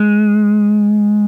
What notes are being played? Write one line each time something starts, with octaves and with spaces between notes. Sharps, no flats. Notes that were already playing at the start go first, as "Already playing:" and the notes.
Already playing: G#3